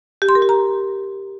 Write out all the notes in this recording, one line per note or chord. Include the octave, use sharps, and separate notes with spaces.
G4
C6
A#4
G4
A#5